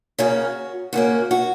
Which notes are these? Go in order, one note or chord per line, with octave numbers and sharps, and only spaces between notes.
C#3 A#3 C#4 F#4
C#3 A#3 C#4 F#4
F#4